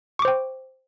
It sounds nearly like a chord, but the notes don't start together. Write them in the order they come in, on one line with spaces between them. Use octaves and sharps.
C#6 D6 C5 G5